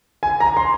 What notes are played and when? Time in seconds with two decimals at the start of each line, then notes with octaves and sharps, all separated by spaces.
0.23 G#5
0.40 A#5
0.57 C6